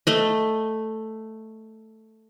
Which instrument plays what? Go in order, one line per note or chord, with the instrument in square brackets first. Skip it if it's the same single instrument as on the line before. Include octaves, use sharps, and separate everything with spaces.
[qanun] A3 D#5